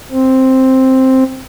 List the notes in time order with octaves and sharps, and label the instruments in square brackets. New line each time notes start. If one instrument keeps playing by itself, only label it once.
[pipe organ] C4